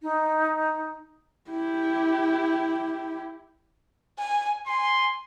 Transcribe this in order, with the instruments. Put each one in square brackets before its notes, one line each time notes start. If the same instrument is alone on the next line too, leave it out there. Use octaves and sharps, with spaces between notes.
[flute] D#4
[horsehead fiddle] E4 G4
[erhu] G#5
[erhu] G#5 [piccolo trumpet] C6